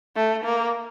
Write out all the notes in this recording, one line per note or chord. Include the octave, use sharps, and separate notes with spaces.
A3
A#3